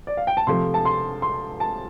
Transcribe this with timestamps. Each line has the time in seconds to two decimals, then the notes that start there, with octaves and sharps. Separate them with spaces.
0.07 D5
0.17 F5
0.27 G5
0.37 A5
0.47 C3 F3 A3 C6
0.74 A5
0.85 C6
1.22 C6
1.60 A5